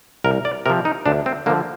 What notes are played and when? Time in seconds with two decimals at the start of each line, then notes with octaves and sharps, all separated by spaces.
0.24 C2 A#4
0.45 D5
0.66 C3 F3 A#4
0.85 D#4
1.06 D2 D4
1.26 C4
1.46 D3 A#3
1.50 F3